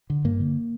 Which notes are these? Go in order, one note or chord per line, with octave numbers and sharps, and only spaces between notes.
D3
G2 A#3
D3